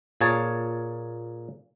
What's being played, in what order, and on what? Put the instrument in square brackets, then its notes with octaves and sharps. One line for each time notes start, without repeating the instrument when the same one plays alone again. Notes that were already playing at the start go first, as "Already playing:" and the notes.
[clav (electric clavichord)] A#2 A#3 G#4 C#5 A5